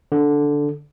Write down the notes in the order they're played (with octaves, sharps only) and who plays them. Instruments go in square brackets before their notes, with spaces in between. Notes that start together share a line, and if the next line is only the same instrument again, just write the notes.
[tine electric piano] D3